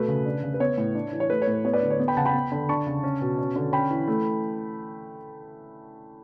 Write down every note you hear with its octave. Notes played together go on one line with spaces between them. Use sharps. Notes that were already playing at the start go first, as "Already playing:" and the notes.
Already playing: B2 A3 B4
C#3
D4
C#3
B4
B3 C#5
A2
D4
E3
C#5
A3 B4
C#5
A2
B4
B3 C#5
B4 D5
D3
C#5
B3
G5 B5
C#3 F#5 A5
G5 B5
B3
D3
D4 A5 C#6
C#3
C#4
B2
C#4
D3
C#4 G5 B5
E3
A3